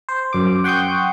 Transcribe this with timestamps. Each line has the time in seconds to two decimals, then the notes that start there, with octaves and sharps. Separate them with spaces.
0.09 C5
0.33 F#2 D6
0.64 F#5 G5 C6 C#6 D#6 G6